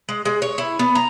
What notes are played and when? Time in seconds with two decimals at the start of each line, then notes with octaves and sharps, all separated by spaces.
0.09 G#3
0.25 G#3
0.42 C#5
0.58 E4
0.79 B3
0.95 A#5